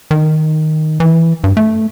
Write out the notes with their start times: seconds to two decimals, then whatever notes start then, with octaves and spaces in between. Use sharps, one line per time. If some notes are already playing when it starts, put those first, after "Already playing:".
0.11 D#3
1.00 E3
1.44 G2
1.57 A3